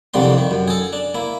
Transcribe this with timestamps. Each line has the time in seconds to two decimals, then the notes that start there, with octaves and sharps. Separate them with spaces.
0.14 C2 F2 D3 G3 A#3 C6
0.38 D#3
0.51 F#2
0.68 G#4 A4
0.93 D4
1.14 A#3 E4